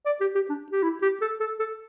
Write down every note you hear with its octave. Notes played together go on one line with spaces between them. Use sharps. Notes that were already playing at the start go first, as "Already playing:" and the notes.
D5
G4
G4
D4
G4
E4
G4
A4
A4
A4